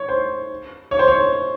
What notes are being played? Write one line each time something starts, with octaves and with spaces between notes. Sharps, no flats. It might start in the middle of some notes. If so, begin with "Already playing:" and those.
Already playing: C#5
C5
C#5
C5
C#5